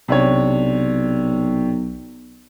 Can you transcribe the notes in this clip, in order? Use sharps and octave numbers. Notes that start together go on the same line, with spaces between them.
B1 C3 D4 C#5